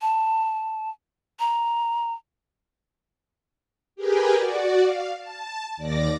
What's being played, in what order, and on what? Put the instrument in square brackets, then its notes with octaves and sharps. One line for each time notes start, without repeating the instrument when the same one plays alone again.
[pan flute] A5
A#5
[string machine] G4 G#4 A#4 B4 G5 G#5
F#4 D5
F5
A5
D#2 D5 D6 A#6